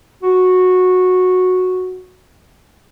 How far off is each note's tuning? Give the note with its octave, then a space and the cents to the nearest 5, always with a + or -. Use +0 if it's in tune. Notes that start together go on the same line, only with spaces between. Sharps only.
F#4 -10